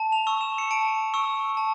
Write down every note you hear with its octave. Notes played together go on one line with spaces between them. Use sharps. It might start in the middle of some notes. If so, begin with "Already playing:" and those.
Already playing: A5
F7
C#6 E6
E7
C#7
A5 D7
C#6 E6
A5